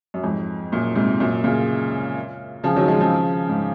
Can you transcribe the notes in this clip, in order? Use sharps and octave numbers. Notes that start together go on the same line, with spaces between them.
F#2
F2 G#2
F#2 A#2
G#2 C3
F#2 A#2
A#2 C#3
C#3 F3
D#3 F#3
F3 G#3
C#3 F3
G#2